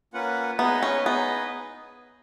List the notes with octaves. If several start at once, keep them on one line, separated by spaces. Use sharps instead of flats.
A#3 C#4 F4 B4 F#5
B3 D#4 G#4 B4 D#5
C#4
B3 D#4 G#4 B4 D#5